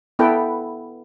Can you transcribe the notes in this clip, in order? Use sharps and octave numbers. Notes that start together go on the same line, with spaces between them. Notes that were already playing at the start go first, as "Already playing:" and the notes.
B3 E4 A4 B4 G5